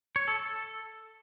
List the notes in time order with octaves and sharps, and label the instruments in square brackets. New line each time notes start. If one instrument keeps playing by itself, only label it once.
[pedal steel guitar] C#5
A4
A4